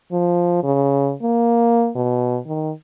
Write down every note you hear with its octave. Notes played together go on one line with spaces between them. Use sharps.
F3
C#3
A#3
B2
D#3